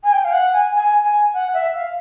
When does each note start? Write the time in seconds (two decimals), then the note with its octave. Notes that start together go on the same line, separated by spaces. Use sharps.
0.04 G#5
0.13 G5
0.25 F5
0.33 F#5
0.53 G#5
0.74 G#5
1.04 G#5
1.34 F#5
1.54 E5
1.74 F5